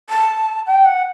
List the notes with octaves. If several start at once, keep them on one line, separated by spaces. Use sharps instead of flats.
A5
G5
F#5